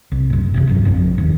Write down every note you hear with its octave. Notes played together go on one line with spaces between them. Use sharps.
C2
F#1 A2
E2 G2 C3
C#2 G2 F#3
A1 F2 C4 D4
D#1 D#3